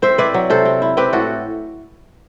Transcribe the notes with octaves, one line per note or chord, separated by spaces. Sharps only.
C4 C5 E5
E4 B4 D5
F#3
C3 A4 C5
C4
E4
C4 G4 B4
A2 F#4 A4